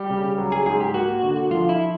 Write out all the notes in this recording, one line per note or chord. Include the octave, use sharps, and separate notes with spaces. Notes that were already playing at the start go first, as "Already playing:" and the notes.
Already playing: G3 G4
C#3
F#3
G#4
G#2 G#4
G4
A#3 F#4
D3
F3 F4
E4